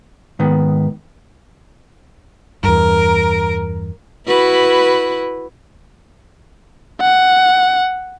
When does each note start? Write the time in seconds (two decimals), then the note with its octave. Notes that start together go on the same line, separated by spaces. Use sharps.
0.39 G#2 D#3 B3
2.64 E2 G2 A#4
4.27 E4 F#4 B4
7.01 F#5